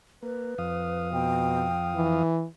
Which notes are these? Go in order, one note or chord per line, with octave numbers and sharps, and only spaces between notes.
A#3 B4
F2 F5 D#6
B2 G5
E3